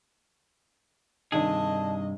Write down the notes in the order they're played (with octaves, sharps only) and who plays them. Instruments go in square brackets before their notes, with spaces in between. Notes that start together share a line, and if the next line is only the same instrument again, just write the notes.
[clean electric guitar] G2 C3 G#4 [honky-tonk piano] D#3 D4 [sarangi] D#5 [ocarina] A5